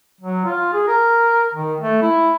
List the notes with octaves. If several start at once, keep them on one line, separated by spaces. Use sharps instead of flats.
F#3
F4
G#4
A#4
D#3
A3
E4